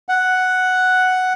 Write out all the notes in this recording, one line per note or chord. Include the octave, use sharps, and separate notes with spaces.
F#5